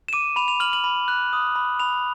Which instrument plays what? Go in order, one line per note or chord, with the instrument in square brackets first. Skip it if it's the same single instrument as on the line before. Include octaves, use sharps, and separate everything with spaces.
[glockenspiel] E7
D6 D#7
B5 F7
F7
F6 F#7
F#7
B5
F#6
D#6
B5
B5 F7